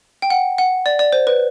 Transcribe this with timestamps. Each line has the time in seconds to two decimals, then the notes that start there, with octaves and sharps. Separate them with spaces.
0.22 G5
0.30 F#5
0.58 F#5
0.86 D5
0.99 D5
1.13 C5
1.27 B4